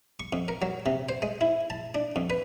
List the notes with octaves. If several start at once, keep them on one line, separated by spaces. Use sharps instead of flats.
C#6
F2
A#4
F#3
C3
C5
G#3
E4
A5
D4
F2
B4